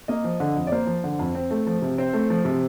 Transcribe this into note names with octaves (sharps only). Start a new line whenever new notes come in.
A#3 D#5
F3
D3
F2
D5
A#3 C5
F3
D3
F2
C4
A3
F3
C3
C4 C5
A3
F3
C3